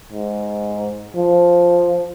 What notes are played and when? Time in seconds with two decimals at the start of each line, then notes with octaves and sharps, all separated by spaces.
0.12 G#2
1.15 F3